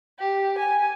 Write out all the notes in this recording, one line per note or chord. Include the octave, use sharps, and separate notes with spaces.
G4
G#5